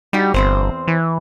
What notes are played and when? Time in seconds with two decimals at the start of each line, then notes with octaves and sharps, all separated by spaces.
0.13 G3 D#4 F#4 G4
0.34 G1 E2 C4 C5
0.88 E3